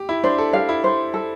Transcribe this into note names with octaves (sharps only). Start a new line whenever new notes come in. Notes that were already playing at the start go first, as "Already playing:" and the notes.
Already playing: G4
E4
D4 C5
A4
G4 F5
E4
C5
A4